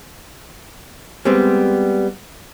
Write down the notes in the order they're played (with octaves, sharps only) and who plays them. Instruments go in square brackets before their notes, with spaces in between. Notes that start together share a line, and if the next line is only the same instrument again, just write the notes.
[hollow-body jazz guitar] G3 G#3 B3 C4